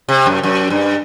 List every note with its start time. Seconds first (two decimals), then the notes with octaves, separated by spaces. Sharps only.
0.09 C3
0.26 F#2
0.43 F#2
0.70 G2